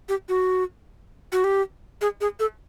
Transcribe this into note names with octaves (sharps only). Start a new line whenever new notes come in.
G4
F#4
F#4
G4
G#4
G#4
A4